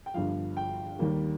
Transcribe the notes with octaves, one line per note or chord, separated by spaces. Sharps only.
G5
G1 G2 F3 F5
G5
D#2 D#3 G3 A#3